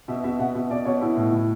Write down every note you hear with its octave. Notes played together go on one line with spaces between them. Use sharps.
B2 E5
B2 E5
B2 F#5
B2 E5
B2 D5
B2 C#5
B2 E4
A2
A2